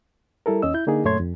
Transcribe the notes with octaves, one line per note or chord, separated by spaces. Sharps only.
G3 E4 A4 A#4
D#2 C#4 D#5 E6
E4 G6
D3 A#3 D#4 G#4
F#2 A#2 A3 C#5 C6 G#6
F2